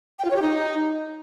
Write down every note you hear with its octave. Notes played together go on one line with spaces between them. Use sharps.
G5
F4
C#5
G4
D#4